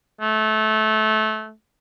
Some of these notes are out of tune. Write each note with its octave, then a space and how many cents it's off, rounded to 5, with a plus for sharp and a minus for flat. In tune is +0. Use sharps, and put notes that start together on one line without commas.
A3 -20